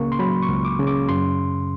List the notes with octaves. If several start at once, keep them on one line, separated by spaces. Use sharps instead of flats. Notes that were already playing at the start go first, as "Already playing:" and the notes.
Already playing: C#2 C#3 A#3 C#6
C6
F#3 B5
C#6
C#2
D6
C#3
D6
F#2 C6